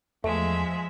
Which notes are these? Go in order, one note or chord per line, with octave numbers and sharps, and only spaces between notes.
E2 F3 G#3 A3 E5